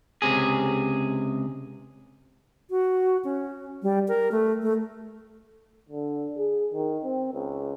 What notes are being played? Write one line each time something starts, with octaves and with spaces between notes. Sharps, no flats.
C#2 C3 G#4
F#4
C#4
G3
A#4
A3
A3
D3
G#4
D#3
C4
C#2